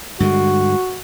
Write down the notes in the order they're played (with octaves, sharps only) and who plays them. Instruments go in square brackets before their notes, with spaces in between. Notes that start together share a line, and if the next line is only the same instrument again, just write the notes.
[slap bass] G2 D3 G#3 [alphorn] F#4